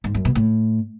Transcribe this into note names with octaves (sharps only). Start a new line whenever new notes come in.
G#2
F#2
B2
A2